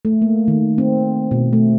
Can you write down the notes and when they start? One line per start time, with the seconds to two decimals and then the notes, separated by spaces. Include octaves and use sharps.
0.05 A3
0.22 A#3
0.48 D#3
0.78 C4
1.31 B2
1.53 A3